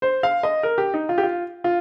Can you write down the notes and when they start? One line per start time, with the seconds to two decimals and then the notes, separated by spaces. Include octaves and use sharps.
0.02 C5
0.23 F5
0.43 D#5
0.63 A#4
0.78 G4
0.94 D#4
1.09 F4
1.18 G4
1.23 F4
1.64 F4